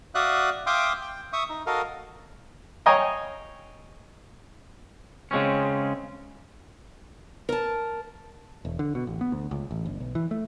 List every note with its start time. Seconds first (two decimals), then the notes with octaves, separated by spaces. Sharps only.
0.15 F#4 D5 E5 F5 D#6 F#6
0.67 E5 F5 G5 C6 D6 D#6
1.01 G5
1.33 E5 C#6 D#6
1.49 D#4
1.66 F#4 A4 A#4 D#5 F5
2.86 C#5 D#5 F5 G5 G#5 A#5
5.31 C#3 G#3 C4 C#4
7.49 A#4 A5
8.65 E1
8.79 D3
8.95 B2
9.07 A1
9.21 B3
9.32 D2
9.51 C#2
9.71 A1
9.86 G1
10.00 B1
10.15 E3
10.31 A3